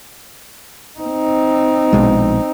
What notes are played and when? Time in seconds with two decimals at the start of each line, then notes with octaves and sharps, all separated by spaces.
0.99 C4 D#4
1.93 A#1 B2 G#3